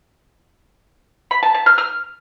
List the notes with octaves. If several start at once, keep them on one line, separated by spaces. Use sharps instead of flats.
B5
A5
A5
F6
F6